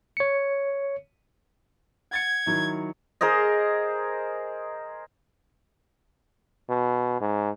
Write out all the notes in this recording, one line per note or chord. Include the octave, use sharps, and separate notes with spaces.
C#5 C#7
F#5 G#6 A6 C#7
D#3 F#3 E4
G#4 A#4 C5 D#5
B2
G#2